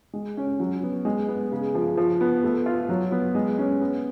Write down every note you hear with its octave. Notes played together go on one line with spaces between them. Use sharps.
G#3
C#4
F#3
B3
G#3
B3
C#3
F3
F3
B3
A3
F4
F#3
B3
G#3
C#4
B3